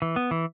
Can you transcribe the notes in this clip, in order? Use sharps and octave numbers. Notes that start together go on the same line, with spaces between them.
E3
B3
E3